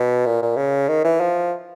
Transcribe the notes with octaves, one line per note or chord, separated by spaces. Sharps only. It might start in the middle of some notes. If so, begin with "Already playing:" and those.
Already playing: B2
A#2
A#2
C#3
D#3
E3
F3